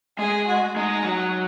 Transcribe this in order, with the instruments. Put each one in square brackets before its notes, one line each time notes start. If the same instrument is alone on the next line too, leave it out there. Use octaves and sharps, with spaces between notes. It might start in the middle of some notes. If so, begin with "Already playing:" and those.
[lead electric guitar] G#3 [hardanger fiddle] G#4
[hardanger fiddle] F#4
[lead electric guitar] G#3 [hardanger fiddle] D#4
[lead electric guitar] F#3